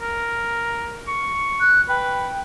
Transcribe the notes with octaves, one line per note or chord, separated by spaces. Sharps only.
A#4
C#6
F#6
B4 G5